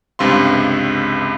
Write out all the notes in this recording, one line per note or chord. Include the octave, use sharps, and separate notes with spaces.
C#2 G2 C3 F5 C6